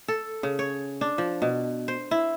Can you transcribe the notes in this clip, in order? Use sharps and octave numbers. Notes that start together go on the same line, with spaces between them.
A4
C#3
C#5
D4
F3
B2
C5
E4